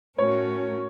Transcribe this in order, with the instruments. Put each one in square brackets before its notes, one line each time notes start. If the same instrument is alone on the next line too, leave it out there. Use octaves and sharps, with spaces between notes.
[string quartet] A2 A3 C#4 F#4 A#4 [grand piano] C#5